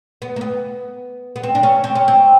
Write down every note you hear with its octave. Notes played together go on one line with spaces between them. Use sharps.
B3
A#3
B3
B3
C4
D4
C#4
C4
C#4
C4